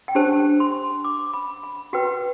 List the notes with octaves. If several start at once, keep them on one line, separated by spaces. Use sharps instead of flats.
G5
D4 G4 C5 A5
C6
D6
B5
B5
F#4 B4 G5